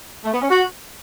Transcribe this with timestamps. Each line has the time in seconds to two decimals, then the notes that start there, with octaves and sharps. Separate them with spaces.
0.25 A3
0.33 B3
0.42 C#4
0.50 F#4